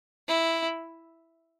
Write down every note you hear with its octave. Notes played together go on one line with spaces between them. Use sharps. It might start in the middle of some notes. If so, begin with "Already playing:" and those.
E4